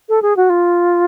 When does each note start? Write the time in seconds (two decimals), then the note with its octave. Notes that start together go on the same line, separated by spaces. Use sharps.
0.09 A4
0.22 G#4
0.37 F#4
0.50 F4